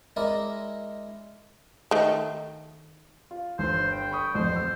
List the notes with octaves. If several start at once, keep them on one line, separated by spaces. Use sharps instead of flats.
G#3 E4 A#4 D5 D#5
D#3 A3
F4
G1 C5
G5
B5 C#6 D#6
D1 F2 C5
E6